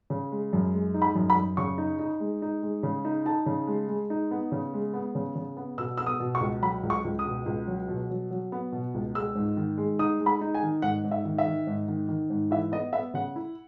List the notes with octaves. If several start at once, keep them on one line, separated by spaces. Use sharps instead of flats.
C#3
G#3
F#2
G#3
D#4
B5
F#2
B5
F#2
C#3 C#6
D#4
D#4
G#3
D#4
G#3
C#3
D#4
D#4 A5
C#3
G#3
G#3
D#4
B3
C#3
G#3
B3
C#3
C#3
B3
B2 E6
B3 E6
D#6
B2
C#6
C#2
F#3 B5
C#2
C#6
C#2
D#6
B2
C#2
F#3
B2
F#3
F#3
B3
B2
C#2
G#3 E6
G#2
D#3
G#3
D#4 D#6
G#3
B5
D#4
G#5
D#3
G#2 F#5
G#2
E5
D#3
E5
D#3
G#2
D#3
D#3
G#2
E3 E5
B3 D#5
B3 E5
C#3 F#5
E4